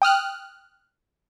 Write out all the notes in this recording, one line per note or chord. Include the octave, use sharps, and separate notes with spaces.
G5 D#6 F6 F#6